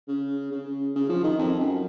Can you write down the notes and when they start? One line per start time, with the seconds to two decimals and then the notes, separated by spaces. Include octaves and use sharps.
0.08 C#3
0.51 C#3
0.95 C#3
1.09 F3
1.24 D#3
1.38 F2
1.60 F#2